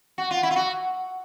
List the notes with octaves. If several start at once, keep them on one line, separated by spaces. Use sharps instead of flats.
F#4
F4
E4
F4
F#4